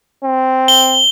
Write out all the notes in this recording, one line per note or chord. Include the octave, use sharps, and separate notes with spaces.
C4
G7